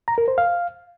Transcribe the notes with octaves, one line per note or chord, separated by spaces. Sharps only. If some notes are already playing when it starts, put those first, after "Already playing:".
A#5
A#4
C5
F5